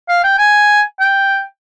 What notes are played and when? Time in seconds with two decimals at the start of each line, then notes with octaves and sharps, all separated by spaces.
0.09 F5
0.24 G5
0.39 G#5
1.00 G5